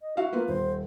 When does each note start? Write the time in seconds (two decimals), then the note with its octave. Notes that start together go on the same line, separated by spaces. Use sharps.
0.01 D#5
0.17 E4 F#4 E5 F5
0.33 A#3 B3 F4 B4
0.48 D#1 C5